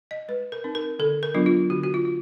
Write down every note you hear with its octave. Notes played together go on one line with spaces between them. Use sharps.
D#5
G#3 B4
A#4
C4 D#4
A#4
D3 A4
A#4
F#3 B3 D4 F4
F4
D3 F#4
F#4
F4
F4